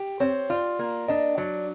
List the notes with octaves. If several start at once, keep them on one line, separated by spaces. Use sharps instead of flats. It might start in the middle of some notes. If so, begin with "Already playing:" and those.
Already playing: G4
C4 C#5
F4 D5
A#3
D4 D#5
F#3 D5